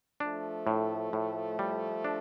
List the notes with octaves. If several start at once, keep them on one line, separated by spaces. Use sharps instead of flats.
F3 A3 D4
A2
A2
G3
D4